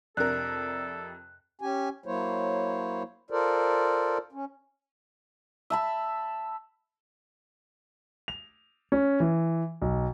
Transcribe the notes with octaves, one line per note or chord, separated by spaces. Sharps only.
F2 C3 D4 A4 A#4 F#6
C#4 G4 G#5
F#3 A#3 E4 C5 C#5
F4 A4 A#4 C5 D5
C#4
E5 A5 B5
F7
C#4
E3
B1